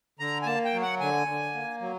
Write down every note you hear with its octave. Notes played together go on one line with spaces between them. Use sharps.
D3 A#5
G#5
A#3 A5
G5
F#3
F#5
D3 G#5
D3
A#3
F#3